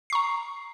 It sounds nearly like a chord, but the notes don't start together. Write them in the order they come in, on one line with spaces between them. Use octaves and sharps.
C7 C#6 A#5